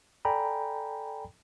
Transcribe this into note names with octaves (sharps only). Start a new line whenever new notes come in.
A4 D5 G5 G#5 A#5 B5